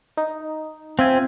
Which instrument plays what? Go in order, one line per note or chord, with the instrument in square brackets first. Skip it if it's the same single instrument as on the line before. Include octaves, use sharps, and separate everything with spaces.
[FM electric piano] D#4
[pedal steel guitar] C4 [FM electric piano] F4 E5 G#5